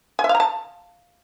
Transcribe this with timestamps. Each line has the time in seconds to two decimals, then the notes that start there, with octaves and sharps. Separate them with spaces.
0.19 G#5
0.24 E5
0.29 F5
0.35 A#5
0.40 A5